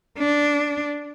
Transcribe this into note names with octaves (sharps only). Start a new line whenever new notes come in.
D4